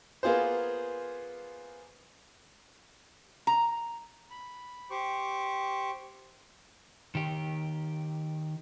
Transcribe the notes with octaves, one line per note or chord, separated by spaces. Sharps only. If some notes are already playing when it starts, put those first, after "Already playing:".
A#3 B3 F4 G#4 C5
A#5
B5
G4 C5 C#6 D6
D#3 G4